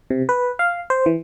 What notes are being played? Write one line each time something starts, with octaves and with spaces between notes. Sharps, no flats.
C3
B4
F5
C5
E3